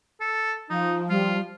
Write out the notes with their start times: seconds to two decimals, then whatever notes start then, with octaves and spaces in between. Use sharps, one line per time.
0.20 A4
0.70 F3 D#4
1.09 G3 F4